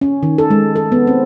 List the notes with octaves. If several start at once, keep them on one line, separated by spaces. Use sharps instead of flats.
C#4
D#3
A4
G#3
A4
B3
C4